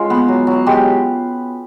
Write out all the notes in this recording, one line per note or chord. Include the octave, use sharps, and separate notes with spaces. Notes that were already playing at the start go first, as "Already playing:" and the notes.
Already playing: G#3 C#4 F4
B3
F#3
F#3
G#3 G4